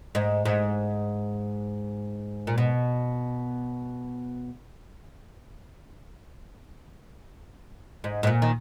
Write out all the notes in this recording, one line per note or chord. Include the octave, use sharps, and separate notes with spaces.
G#2
G#2
A#2
B2
G#2
G#2
A#2
D#3